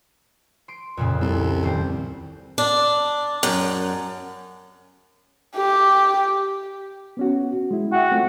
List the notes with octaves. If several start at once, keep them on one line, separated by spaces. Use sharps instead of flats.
C6 D7
F2 A#2 C#3
C2 A4
D#1 C5 G5
D4
F#2
G4
B3 C#4 F#4
G#3 E4
F#4 E5 G5
A3 C4 F4